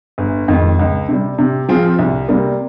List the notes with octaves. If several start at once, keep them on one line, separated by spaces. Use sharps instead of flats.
G1
F2 D#3 G#3
C#2
C3 G3
C3
F3 C4 F4 G#4
C2
C3 G3 A#3